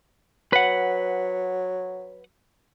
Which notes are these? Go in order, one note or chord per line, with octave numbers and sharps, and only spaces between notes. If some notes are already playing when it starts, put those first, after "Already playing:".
F#3 B4 F#5